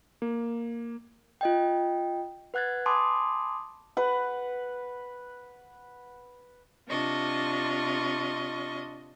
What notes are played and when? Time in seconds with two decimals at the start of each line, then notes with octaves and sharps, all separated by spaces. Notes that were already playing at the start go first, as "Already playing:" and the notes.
0.22 A#3
1.41 F4 D#5 G5
2.54 B4 F#5 F#6 G#6 A6
2.86 G#5 A5 B5 C6 D6 D#6
3.97 B4 F#5
6.88 C3 D4 F4 D#5 C#6